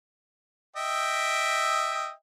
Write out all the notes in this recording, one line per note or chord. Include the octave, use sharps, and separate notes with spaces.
D#5 E5 G5